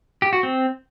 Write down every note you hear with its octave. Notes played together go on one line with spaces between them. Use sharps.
G4
F#4
C4